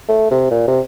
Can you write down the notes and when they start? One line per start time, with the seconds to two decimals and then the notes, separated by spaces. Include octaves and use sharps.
0.09 A3
0.31 C3
0.51 A#2
0.68 C3